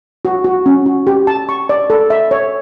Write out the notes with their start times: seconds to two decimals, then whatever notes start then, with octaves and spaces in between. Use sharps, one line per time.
0.25 F#4
0.44 F#4
0.66 C#4
0.86 F#4
1.07 G4
1.27 A5
1.49 C#6
1.69 D5
1.90 A4
2.10 E5
2.31 C#5